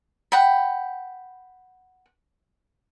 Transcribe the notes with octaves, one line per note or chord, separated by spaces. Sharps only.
F#5 G5 B5